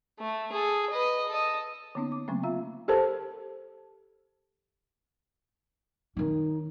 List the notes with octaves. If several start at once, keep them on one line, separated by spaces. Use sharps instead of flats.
A3
G#4 A4
B4 D#5
A4 D#5
D3 A#3 B3 C#4 D#4
D6
C#3 F#3 A3 A#3 C4 C#4
C4 F4 E5 F5 A#5
G4 A4 A#4 C5 A5
D#3 C#4 D#4